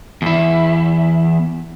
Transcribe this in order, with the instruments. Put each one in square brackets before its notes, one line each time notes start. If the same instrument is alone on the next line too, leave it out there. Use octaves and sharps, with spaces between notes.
[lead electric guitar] E2 E4